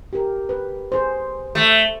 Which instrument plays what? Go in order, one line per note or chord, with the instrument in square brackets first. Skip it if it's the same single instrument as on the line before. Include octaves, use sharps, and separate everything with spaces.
[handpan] G4 A#4
B4
G#4 C5
[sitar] A3